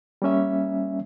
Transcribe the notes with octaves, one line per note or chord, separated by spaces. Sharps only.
G3 A#3 C#4 E5